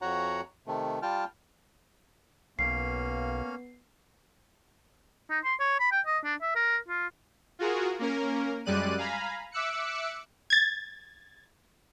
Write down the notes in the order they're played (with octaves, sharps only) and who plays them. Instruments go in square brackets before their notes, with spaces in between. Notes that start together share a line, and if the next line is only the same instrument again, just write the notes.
[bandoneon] F2 F#4 C#5 F#5 A#5
C3 D#3 A3
G3 F4 G5 A5 F6
[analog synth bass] B1 [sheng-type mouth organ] A#3 C#4 F5 [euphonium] B3 [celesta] C7
[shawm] D#4
C6
C#5
B5
G5
D#5
D4
E5
A#4
F4
[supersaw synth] F4 F#4 G#4 A#4
A#3 C#4 A#4
F#2 G3 G#3 D5 F#6 D#7
F5 G#5 A#5 B5
E5 D6 E6 F#6 C#7
[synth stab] G#6 A6